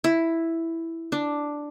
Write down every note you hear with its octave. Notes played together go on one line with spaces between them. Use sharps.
E4
D4